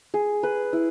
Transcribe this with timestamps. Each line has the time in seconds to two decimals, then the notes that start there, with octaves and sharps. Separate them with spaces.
0.14 G#4
0.43 B4
0.73 E4